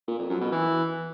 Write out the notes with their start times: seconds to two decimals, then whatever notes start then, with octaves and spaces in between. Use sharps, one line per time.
0.08 A#2
0.19 F2
0.30 F#2
0.41 B2
0.52 E3